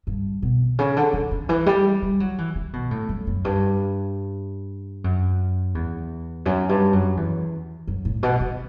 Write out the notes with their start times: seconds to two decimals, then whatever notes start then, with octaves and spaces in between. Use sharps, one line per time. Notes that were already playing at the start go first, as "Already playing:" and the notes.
0.07 G2
0.42 B2
0.79 C#3
0.97 D3
1.13 D3
1.31 D3
1.49 E3
1.66 G3
2.02 G3
2.20 F#3
2.38 E3
2.55 D3
2.73 B2
2.91 A2
3.09 F#2
3.27 F#2
3.45 G2
5.04 F#2
5.75 E2
6.46 F#2
6.69 G2
6.93 F#2
7.17 E2
7.87 F#2
8.05 A2
8.23 B2
8.40 D3